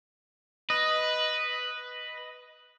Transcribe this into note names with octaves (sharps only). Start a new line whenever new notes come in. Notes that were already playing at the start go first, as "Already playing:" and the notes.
B4 D#5